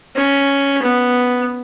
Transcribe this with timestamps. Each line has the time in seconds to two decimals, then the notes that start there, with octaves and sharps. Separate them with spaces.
0.16 C#4
0.82 B3